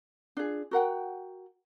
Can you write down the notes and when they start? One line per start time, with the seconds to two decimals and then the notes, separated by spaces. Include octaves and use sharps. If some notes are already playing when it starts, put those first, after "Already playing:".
0.37 D4 F4 G#4
0.71 F#4 A#4 F#5 G5